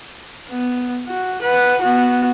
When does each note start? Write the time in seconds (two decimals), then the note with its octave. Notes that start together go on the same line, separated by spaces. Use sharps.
0.50 B3
1.09 F#4
1.42 B4 F#5
1.82 B3 F#4